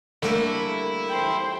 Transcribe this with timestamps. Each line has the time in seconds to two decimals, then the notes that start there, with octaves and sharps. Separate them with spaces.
0.23 D3 G3 A3 A#3 E4 A#4
1.08 C5 G5